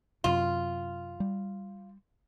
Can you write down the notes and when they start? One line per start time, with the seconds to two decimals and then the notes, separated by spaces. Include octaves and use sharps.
0.24 F#2 C3 F4
1.20 G3